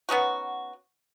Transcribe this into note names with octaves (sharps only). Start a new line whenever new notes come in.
B3 C#4 D#4 F#4